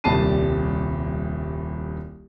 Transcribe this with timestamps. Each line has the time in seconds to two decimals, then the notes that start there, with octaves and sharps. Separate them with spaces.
0.04 D#1 C2 G3 A5 C7 D#7